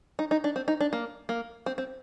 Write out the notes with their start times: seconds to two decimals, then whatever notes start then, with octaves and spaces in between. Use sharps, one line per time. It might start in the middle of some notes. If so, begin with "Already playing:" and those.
0.19 D#4
0.31 D#4
0.44 D4
0.56 C4
0.68 D#4
0.80 D4
0.93 A#3
1.29 A#3
1.66 C4
1.78 C4